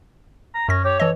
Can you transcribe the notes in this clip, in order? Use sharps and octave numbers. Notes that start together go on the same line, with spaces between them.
A#5
F#2 C#4 A#6
G4 C#5
E3 A4 D#5